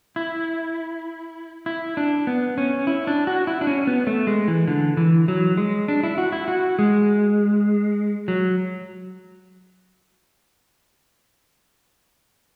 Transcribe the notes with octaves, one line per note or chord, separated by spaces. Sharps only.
E4
E4
D4
B3
C#4
E4
D4
F#4
E4
D4
C#4
B3
A3
G#3
E3
D3
E3
F#3
G#3
D4
E4
F#4
E4
F#4
G#3
F#3